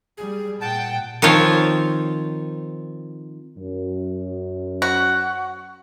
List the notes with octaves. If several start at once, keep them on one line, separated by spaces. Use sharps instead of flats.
G3 G#4
A#2 F#5 G5 A5
D#3 F3 C4 F4 C#5
F#2
F#4